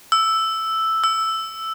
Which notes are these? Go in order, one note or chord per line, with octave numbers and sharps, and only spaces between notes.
E6
E6